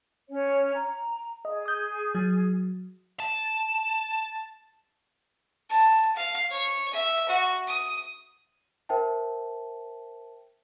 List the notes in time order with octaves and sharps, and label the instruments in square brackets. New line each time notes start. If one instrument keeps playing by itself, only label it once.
[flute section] C#4 C#5
A#5
[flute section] G#4 [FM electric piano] D#5
[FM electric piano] D#6 G6
F#3
[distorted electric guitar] A5
[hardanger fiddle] A5
F5
C#5
E5
F#4
D#6
[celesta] A#4 C5 E5 G5 A5